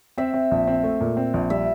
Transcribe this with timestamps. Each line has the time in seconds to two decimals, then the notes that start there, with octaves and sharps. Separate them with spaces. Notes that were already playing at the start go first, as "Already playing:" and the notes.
0.18 C4 E5
0.34 C4
0.51 A#1
0.67 C4
0.83 A3
1.00 A#2
1.17 C4
1.34 A#1
1.50 G3 E5